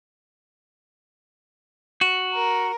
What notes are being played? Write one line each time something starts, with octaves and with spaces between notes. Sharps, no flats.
F#4
A#4